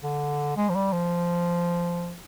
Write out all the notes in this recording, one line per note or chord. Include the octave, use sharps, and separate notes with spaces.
D3
G#3
F3
G3
F3